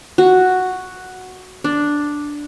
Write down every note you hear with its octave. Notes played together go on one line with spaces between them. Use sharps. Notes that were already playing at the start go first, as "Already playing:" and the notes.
F#4
D4